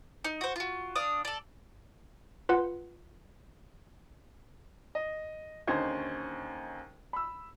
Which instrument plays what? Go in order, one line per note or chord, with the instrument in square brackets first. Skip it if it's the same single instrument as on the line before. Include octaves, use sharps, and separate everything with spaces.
[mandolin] D#4
F#4 C5
F4 F#4
D4 F5 D#6
A4 D5
[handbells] F4 B4 F#5
[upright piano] D#5
D#2 D3 C#4 D#4 C5 G#6
B5 E6